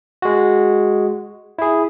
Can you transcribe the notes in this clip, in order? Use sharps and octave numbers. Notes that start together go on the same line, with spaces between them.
G#3 F#4
E4 G#4